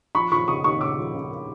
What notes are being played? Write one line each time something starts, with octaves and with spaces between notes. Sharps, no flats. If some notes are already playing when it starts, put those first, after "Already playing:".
F3 B5 C#6
F3 B5 C#6
C#3 C#6 D#6
D#2 C#6 D#6
C#3 D6 E6
F3
C#3